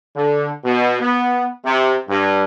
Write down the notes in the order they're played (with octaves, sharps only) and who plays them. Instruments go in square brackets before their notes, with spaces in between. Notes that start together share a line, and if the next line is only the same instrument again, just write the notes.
[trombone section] D3
B2
B3
C3
G2